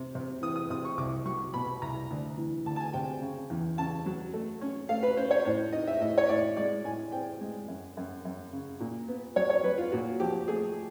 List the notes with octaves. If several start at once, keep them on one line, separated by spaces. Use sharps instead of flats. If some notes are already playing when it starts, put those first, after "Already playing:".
Already playing: C3
C3
E3 D#6
D#6
C3 D#6
C#6
C2 D6
F#3 C#6
B2 B5
C2 A#5
D2
E3
D2 A5
A5
G#5
C3 G5
C#3
E2
C#3 A5
F#3
A3
C#4
A3 F5
B4
C#4 C5
C#5
A2 C5
D#4 D#5
E5
A2 D#5
C#5
A2 D5
G#3 D5
A2 G#5
C4 G5
G#3
F#2
F#2
F#2
C#3
A#2
B3
F#3 C#5
C#5
F#3 B4
F4
A#2 F#4
F3 G4
A3 G#4